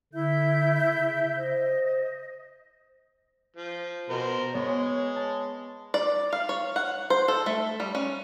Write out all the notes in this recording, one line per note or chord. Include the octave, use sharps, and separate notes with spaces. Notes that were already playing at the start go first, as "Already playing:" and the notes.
D3 E4 E5 G6
C#3
C5 D#5
F3
B2 A#4 C5
G#3 B3 C#5
A5
D5
F5
C#5
F#5
C5
A4
A3
G3
C#4